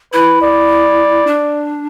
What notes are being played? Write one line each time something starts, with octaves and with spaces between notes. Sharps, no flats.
E4 B4
D5
D4